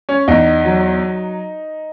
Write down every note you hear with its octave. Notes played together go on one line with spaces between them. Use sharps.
C#4
E2 D#4
F#3